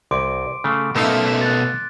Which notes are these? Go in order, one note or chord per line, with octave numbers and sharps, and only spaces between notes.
C2 C6 D6 D7
C#3 A3
F#2 B2 A3 D#4 A4 A#4 F5
F#6 A6